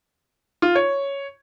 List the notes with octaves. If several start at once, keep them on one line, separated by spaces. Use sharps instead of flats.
F4
C#5